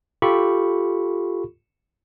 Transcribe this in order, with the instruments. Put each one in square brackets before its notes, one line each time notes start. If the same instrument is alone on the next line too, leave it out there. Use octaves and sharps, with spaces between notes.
[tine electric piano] F4 G4 A4 B5 C#6